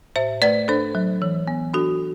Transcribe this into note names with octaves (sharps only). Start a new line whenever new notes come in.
A2 C5 E5
A3 B4 D5
D4 A4 C5
F#3
E3
B3
D4 F#4 A4